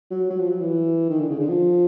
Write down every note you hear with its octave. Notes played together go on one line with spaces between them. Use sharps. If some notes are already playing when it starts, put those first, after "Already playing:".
F#3
F#3
F3
F#3
E3
D#3
D3
C#3
D3
F3